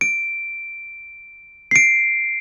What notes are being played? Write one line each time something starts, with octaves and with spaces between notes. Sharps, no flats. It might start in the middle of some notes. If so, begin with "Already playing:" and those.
D7
C7 D7